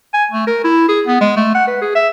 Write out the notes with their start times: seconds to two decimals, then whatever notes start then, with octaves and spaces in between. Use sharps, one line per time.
0.14 G#5
0.31 A3
0.47 A#4
0.64 E4
0.88 G#4
1.07 B3
1.21 G#3
1.36 A3
1.55 F#5
1.67 B4
1.81 G#4
1.95 E5